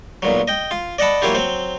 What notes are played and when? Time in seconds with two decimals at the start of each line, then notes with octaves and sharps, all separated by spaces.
0.22 B1 A#2 F#3
0.48 D#5 G5
0.71 F4
0.98 D5 D#5 F#5 A5 B5
1.22 F#3 A#3 E4 F4 G4
1.35 F#3 C4